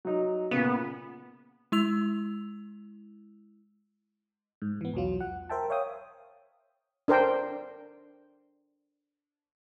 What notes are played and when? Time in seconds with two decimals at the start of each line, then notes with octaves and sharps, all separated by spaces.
0.05 F#3 D#4
0.51 A#2 C#3 B3
1.72 G#3 E4 E6 F7
4.62 G#2
4.81 E3 B3
4.94 B1 E2 F#3 F4
5.21 F#5
5.50 A#4 C5 E5 G5 A5
5.70 C#5 E5 F5 G5 D#6
7.08 D4 A#4 C5 G5